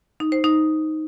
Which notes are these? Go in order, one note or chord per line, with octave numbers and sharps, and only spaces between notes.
D#4
C5
D#4